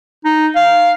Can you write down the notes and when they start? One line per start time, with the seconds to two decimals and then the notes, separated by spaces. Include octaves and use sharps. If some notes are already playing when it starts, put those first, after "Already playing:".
0.25 D#4
0.56 F5